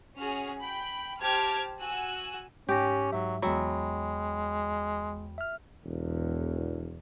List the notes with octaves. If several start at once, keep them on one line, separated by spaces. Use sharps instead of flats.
C#4 F#4 G#4 F6
G5 B5
G4 C5 A5 F6 G#6 D7
F#4 G#5 E6 F#6
G#2 C#4 G4 D6 A#6
G#2 F#3 E5
E2 F#3 G#3 E5 G5 B5
E5 F6
E1 E2